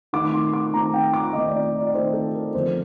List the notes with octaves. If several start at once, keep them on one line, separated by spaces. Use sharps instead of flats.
D#3 A3 C4 D6
C6
D6
D#3 A3 C4 A#5
G5
D6
D#3 A3 C4 D#5
D5
D5
D#3 A3 C4 C5
A4
A#4
F2 D3 F3 C5